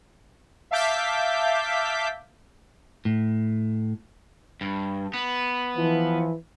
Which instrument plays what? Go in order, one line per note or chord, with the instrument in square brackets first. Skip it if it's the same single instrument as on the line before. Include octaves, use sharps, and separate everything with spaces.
[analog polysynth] E5 F5 A5 D6 G6 B6
[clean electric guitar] A2
[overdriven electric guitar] G2
B3
[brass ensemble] E3 F3